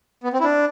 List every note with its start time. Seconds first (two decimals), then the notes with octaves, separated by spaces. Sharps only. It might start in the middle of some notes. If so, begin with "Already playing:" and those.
0.23 B3
0.33 C4
0.40 E4
0.44 D4